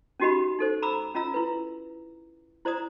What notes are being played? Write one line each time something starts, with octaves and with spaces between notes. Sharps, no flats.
C#4 D#4 F#4 G4 D#5 B5
D#4 A4 C5
A#5 B5 D6 E6
C#4 F4 D#5 A#5 E6
E4 B4
E4 C5 D5 A#5 D#6